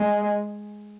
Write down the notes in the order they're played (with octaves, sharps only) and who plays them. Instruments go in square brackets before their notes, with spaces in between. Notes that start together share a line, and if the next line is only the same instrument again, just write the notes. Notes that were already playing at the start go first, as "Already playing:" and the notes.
Already playing: [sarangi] G#3